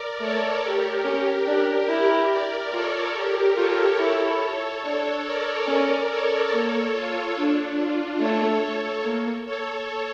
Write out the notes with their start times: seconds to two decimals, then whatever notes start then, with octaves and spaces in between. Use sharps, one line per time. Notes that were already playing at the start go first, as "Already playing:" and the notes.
Already playing: A#4 D5
0.20 A3 A4 C#5
0.63 G4 A#4
1.05 C#4 G4 A#4
1.47 D4
1.89 E4
2.31 A#4 D5
2.73 F4 A4 C#5
3.15 G4 A#4
3.57 F4 A4 C#5
3.99 E4 A4 C#5
4.83 D4 A4 C#5
5.25 A#4 D5
5.68 C#4
6.09 A4 C#5
6.52 A#3
6.93 F4 A4
7.36 D4
7.78 D4 F4
8.19 A3 A4 C#5
9.04 A#3
9.46 A4 C#5